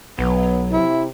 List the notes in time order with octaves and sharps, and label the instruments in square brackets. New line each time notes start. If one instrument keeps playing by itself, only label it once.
[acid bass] B1 [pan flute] F#3 [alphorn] B3
[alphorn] C3 [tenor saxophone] E4